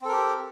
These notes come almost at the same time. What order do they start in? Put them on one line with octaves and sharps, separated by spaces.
C4 A4 A#4 G4